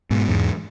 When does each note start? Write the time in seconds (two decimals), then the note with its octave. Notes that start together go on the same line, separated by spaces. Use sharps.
0.11 G#2 B2
0.29 E2 G#2